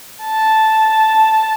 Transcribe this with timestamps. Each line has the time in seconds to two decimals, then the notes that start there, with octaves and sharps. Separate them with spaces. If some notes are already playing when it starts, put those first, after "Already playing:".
0.25 A5